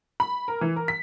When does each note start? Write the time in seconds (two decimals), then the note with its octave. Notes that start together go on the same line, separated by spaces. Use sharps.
0.20 B5
0.48 A#4
0.61 E3
0.76 A#4
0.88 B6